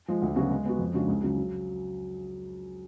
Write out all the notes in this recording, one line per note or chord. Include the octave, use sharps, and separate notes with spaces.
F3 G#3
D2
C#3 F#3 B3 F#4
G#3
B3 F#4
F2
C#3 G#3 D4 F#4
C#2
C#3 F#3
F#3